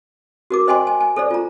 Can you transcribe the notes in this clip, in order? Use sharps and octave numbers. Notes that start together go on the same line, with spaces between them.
F#4 A#4 D6
C5 D#5 G5 G#5 C6
G#5
G#5
A4 C5 D5
F4 A#5